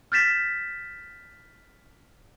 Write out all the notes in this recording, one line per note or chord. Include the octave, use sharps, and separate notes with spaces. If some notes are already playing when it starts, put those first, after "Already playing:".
F6 G6 A6 B6 E7